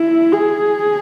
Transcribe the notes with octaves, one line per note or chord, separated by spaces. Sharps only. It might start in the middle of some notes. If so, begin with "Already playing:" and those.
Already playing: E4
G#4